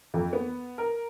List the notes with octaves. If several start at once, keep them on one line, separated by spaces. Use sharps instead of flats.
F2
B3
A#4